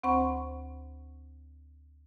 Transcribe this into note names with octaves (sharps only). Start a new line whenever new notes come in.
D2 C4 C5 F#5 B5 C#6